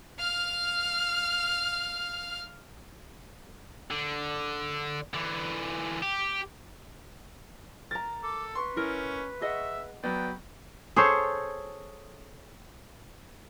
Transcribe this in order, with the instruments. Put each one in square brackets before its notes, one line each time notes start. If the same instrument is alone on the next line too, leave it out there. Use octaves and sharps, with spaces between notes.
[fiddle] F5 F6
[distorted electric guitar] D3
D3 E3
G4
[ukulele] A#4 A#5 [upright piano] A6
[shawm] A4 [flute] D6
[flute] B4 [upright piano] C6 C#6
[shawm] C#4 [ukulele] E4 A#4
[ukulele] G#4 D#5 F#5 [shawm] E5
[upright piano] F#3 B3 [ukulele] D5 [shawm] G5 [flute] B5
[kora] G#4 A4 C5 C#5